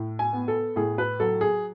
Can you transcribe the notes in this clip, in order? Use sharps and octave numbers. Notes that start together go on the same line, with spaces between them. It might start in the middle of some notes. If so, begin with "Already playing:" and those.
Already playing: A2
G#5
B3
A4
A2 G#4
B4
F#3 A4
G#4